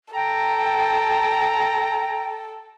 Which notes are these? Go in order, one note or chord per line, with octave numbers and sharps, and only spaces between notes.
A4 G5 A#5